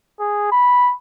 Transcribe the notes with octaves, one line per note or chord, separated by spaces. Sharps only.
G#4
B5